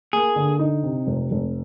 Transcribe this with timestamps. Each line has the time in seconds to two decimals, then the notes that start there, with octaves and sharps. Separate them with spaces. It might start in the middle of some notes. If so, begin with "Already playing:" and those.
0.13 A#3 G#4
0.36 D3
0.59 D#4
0.83 C3
1.07 F1
1.31 F1